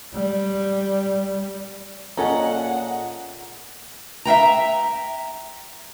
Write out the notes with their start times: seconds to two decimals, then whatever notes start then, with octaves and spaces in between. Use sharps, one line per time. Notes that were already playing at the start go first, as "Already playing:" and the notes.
0.14 G3
2.17 A#2 C#4 G#4 A4 D#5 F#5 G#5 A#5
4.25 E5 F5 G5 A#5